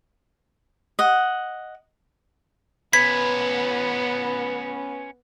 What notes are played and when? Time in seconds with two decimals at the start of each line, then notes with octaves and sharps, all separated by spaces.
0.99 D#5 F#5
2.93 B3 C#4 B4 G#6 B6